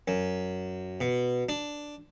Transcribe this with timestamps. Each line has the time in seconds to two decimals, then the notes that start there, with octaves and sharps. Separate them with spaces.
0.08 F#2
1.01 B2
1.49 D4